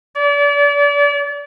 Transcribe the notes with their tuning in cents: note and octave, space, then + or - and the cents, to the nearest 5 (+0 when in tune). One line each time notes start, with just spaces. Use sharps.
D5 -35